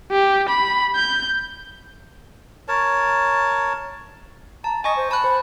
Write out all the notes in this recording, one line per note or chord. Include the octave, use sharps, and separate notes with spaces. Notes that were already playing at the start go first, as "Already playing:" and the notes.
G4
B5
G6
A#4 C#5 A5
A5 A#5
D#5 G#5 C#6 A#6
C5
A5 B5 F#6
C5